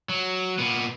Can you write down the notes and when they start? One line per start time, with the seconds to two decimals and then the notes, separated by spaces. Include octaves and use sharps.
0.09 F#3
0.59 A#2 B3